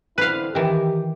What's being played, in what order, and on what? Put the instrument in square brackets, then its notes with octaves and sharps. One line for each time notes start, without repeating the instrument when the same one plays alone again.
[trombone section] D3 C4 E4 [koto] B4 F5
[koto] D#3 E3 [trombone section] G4